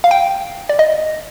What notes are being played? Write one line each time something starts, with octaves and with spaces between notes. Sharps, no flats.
F5
G5
D5
D#5